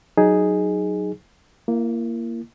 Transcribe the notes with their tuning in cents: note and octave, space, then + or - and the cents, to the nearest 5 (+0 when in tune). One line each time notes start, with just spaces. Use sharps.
F#3 +5 D#4 +0 G#4 +0
A#3 +0 E4 +40